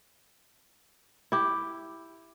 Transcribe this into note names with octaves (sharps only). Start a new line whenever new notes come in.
E4 G4